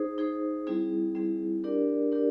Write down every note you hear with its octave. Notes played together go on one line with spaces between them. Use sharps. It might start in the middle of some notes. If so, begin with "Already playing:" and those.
Already playing: D#4 G#4 C5
D#4 G#4 C5
G3 C4 E4 G#4
G3 C4 E4 G#4
D4 G4 A#4 D5
D4 G4 A#4 D5